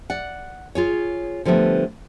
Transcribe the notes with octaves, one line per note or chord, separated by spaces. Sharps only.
D5 F#5
F4 G#4 C#5
D3 F3 G3 A3 B3